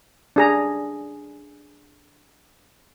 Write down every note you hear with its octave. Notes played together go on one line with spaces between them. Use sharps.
D4 G#4 A#5